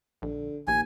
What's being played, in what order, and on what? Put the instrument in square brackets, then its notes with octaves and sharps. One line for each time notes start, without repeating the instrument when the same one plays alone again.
[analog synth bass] A#1 [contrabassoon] D3
[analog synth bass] A#1 [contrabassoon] D#2 [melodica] G#5